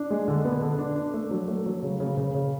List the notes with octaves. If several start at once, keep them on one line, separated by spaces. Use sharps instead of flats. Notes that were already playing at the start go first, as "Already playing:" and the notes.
Already playing: D4
G#3
D3
B3
D3
D4
D4
A3
F#3
A3
F#3
C#3
C#3
C#3
C#3